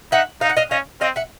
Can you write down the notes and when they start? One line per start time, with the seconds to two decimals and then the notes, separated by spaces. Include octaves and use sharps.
0.12 D#4 E5 F#5
0.41 D#4 F5
0.49 F#5
0.57 D#5 F5
0.71 C#4 D#5 F5
1.01 C4 D#5 F5
1.16 E5 F#5